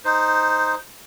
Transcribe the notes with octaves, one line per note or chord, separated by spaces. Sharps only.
D#4 C5